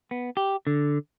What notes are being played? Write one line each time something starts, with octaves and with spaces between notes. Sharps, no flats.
B3
G4
D3